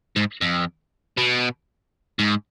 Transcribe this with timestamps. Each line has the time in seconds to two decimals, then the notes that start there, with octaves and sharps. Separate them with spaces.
0.16 G#2
0.41 F2
1.17 B2
2.19 G#2